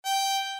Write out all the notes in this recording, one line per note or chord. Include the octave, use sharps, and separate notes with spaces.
G5